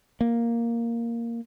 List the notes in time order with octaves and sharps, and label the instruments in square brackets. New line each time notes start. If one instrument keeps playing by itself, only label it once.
[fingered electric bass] A#3